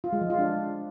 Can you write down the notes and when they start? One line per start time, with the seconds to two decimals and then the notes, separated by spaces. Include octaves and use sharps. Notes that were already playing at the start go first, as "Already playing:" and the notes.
0.04 F4
0.13 G#3
0.21 F3
0.30 F4
0.39 D4